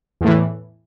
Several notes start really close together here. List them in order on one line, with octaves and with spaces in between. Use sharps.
E2 A2 E3